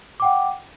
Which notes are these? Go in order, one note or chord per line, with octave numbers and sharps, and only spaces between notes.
F#5 G5 D6